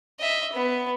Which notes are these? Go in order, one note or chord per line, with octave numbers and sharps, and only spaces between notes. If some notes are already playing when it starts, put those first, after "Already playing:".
D#5 E5
B3